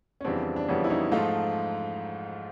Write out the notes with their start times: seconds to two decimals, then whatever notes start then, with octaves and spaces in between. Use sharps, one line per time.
0.21 C#4
0.25 F2 C#3 E3 G3 B3 C4 D4
0.56 D4
0.68 F2 C#3 E3 G3 B3 C#4
0.84 E4
0.90 C#4 D#4
1.11 G#2 F3 A3 D#4 F4